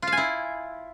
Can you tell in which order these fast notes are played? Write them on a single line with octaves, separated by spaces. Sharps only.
F4 F5 G#5 E4